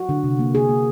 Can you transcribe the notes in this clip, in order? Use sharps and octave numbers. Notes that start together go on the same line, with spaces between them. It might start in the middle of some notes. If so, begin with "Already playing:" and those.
Already playing: F#4
D3
C3
A#3
A#3 G#4
A#3